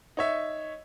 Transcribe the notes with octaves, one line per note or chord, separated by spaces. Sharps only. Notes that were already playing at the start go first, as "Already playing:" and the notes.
D#4 C#5 E5